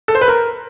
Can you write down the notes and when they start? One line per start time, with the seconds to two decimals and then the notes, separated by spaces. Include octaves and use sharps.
0.08 A4
0.15 C5
0.21 B4
0.28 A#4